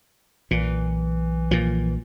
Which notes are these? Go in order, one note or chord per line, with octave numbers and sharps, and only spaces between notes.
B1 A#2 E3
A#2 F3